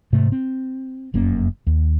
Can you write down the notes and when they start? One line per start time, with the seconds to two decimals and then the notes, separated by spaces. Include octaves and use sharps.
0.13 G#2 C3 A3
0.32 C4
1.14 F1 F#2 A#3 C#4
1.67 D#2